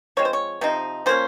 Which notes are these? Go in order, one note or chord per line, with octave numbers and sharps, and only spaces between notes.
F3 G#3 C4 C#5
C5
C#5
C3 F3 C4 D#4
F3 A#3 C#4 C5